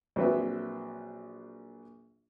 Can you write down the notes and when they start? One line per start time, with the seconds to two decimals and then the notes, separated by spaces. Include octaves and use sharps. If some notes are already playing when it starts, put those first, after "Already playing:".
0.16 A#1 F#3 C4 B4 E5